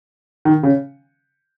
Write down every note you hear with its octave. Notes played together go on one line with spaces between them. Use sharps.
D#3
C#3